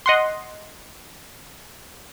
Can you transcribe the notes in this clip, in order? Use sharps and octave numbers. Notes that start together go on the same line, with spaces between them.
D#5 F#5 C6